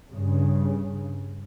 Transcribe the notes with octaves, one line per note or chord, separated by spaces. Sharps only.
G2 C#3